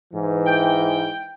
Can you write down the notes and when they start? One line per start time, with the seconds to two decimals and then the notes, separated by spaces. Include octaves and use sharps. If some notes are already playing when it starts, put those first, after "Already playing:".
0.14 G#2 E3
0.47 G5